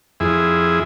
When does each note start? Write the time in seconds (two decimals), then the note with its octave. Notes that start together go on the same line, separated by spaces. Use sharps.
0.20 F2 E4 G#4